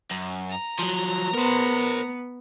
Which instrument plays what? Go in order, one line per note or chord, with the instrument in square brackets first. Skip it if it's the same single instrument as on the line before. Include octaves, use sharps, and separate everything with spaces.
[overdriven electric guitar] F#2
[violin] A#5
[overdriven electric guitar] F3 F#3
[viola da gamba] B3 [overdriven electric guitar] A#4 C5